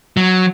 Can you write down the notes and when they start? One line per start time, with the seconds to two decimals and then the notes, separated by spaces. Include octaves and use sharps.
0.17 F#3